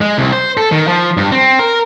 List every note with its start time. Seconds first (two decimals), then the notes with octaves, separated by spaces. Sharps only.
0.01 G#3
0.18 C2
0.33 C5
0.57 A4
0.72 D#3
0.88 F3
1.17 G2
1.32 C4
1.59 A#4